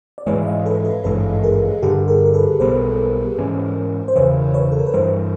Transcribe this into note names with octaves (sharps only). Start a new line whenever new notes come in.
D5
G#2 E3 G#3 B4 C#5
E5
D#5 F5
A4 B4
A4 B4
G#1 G2 E3 G#3 A4 B4
G#4 A#4
G2 D3 G3 G4 A4
G#4 A#4
A#4
A4 B4
B1 B2 G3 B3 A#4 C5
G#2 E3 G#3 C#4
C5
E1 E2 C#3 E3 B4 C#5
B4 C#5
A4
A#4
B4
G2 E3 G3 A#4 C5